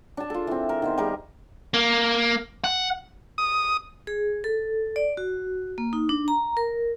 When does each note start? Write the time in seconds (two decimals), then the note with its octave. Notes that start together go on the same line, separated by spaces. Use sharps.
0.17 D4 A5
0.30 F4 A4
0.47 E3 C4
0.69 A#4
0.82 D#3 B3 C5
0.98 G3 G#4 A#4 D6
1.74 A#3
2.64 F#5
3.38 D#6
4.07 G#4
4.44 A4
4.96 D5
5.17 F#4
5.78 A#3
5.93 D#4
6.09 D4
6.28 A#5
6.57 A#4